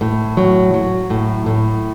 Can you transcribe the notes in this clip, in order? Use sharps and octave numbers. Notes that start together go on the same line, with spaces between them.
A2
F#3
F#3
A2
A2